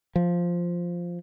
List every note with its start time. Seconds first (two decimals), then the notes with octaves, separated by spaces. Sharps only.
0.16 F3